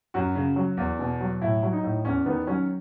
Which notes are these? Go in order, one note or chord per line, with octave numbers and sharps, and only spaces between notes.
F#2 F#4
C#3
F#3
E2
B2
F#3
A2 E4
F#3
D#4
A2
E2 C#4
D#3 B3
F#3 C#4